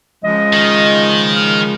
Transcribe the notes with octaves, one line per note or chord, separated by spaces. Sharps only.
C#3 F3 G#3 D#5
D#3
F6